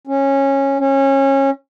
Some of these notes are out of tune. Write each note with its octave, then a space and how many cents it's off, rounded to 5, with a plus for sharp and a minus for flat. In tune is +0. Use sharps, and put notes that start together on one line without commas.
C#4 -15
C#4 -25